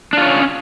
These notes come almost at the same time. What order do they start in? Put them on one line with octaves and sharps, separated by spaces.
D4 F4 C#5 C#4